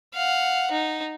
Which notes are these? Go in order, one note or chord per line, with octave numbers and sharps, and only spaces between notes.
F5 F#5
D#4